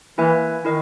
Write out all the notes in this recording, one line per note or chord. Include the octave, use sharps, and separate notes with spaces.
E3 A#3 E4 B4 E5 G#5
D#3 E4 A#4 D#5